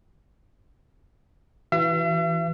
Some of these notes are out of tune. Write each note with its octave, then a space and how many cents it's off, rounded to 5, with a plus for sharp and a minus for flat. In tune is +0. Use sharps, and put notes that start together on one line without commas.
E3 +0 F#4 +30 E5 +45